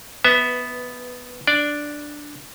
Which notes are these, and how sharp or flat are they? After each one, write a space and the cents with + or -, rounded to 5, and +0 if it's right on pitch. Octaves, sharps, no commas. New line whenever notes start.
B3 +0 B4 +15 E5 -20
D4 +0 D5 +0